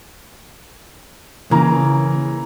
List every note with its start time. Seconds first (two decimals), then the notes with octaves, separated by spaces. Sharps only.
1.51 C#3 E3 A#3 A#5